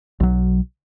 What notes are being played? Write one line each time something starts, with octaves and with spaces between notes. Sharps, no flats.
B1 F#3